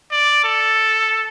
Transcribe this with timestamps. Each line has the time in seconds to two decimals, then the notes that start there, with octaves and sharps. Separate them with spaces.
0.12 D5
0.44 A4